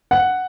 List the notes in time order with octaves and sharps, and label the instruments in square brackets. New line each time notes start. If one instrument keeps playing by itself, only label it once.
[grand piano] F#5